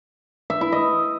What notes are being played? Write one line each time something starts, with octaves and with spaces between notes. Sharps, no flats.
E5
E4
D#5